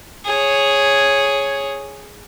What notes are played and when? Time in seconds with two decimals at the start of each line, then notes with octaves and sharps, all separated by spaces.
0.25 G#4 C#5